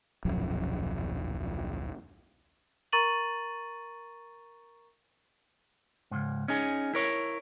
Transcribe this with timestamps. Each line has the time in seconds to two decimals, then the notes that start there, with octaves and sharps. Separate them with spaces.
0.25 D#1 B1 F#2 F3
2.93 A#4 A#5 C#6 A6 D#7 F#7
6.11 C#2 G#2
6.48 C#4 D#4 G#4
6.94 E4 A#4 C#5